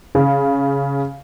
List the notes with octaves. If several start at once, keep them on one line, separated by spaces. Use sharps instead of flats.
C#3